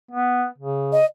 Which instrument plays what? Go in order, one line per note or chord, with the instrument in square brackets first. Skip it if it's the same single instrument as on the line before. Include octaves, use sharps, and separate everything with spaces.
[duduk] B3
C#3
[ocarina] D#5